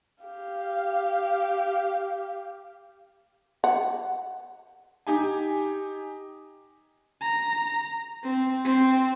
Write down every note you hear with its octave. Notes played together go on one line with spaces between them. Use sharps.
G4 F5
F#5
D#4 G4 G#5
A#5
C4
C4